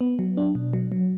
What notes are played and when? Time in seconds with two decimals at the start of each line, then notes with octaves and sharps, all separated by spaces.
0.01 B3
0.19 F#3
0.37 D4
0.55 B2
0.73 F#3
0.92 F#3